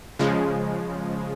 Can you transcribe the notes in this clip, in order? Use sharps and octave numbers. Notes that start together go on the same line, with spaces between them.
C#3 F3 G#3